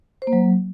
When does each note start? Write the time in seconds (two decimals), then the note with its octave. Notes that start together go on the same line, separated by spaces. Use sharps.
0.22 C5
0.27 A#3
0.33 F#3